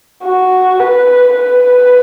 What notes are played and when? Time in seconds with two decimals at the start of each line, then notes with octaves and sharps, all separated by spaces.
0.25 F#4
0.80 B4
1.36 B4